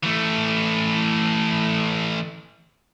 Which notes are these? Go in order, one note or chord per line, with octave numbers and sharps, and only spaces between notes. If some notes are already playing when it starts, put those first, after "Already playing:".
E3 A3